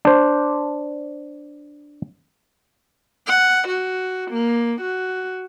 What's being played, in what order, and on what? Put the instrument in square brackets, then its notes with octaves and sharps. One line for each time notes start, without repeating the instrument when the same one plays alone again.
[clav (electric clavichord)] D4 C5
[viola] F#5
F#4
A#3
F#4